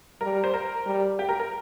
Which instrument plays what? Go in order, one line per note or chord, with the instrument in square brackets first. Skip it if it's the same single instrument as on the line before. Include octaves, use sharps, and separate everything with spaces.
[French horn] G3 [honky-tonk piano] A#4
[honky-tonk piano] C5
A#4
[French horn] G3
[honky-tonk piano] G4
A#4
A#4